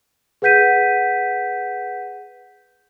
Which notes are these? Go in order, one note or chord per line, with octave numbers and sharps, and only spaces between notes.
G#4 B4 F#5 G6 B6 D#7